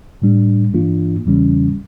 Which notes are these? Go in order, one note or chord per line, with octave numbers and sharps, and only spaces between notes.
A2 G3 D4
G2 E3 A#3 D4 F4
E2 C#3 E3 G3 C#4